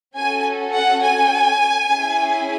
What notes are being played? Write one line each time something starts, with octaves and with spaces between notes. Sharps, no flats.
C#4 F#4 A4 G#5
F#5
G#5
C#4 E4 G#4